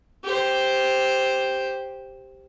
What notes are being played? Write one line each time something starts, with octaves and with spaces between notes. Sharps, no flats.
G4 C5